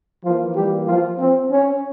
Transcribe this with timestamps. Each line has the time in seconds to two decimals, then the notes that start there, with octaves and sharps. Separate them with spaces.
0.25 E3 F3 A#3 F4
0.56 G3 G4
0.88 F3 F4
1.19 C4
1.51 C#4